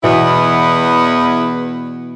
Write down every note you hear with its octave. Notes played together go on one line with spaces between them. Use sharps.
E2 B2 E3 B3 E4